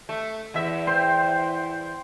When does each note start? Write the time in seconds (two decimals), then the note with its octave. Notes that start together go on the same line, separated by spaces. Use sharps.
0.09 A3
0.54 E2 E5
0.87 C5 G5 C6